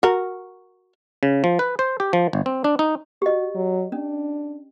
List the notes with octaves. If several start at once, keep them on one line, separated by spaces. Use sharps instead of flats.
F#4 A#4
C#3
F3
B4
C5
G4
F3
G1
C4
D4
D#4
F#4 G4 D#5
F#3
C#4 D4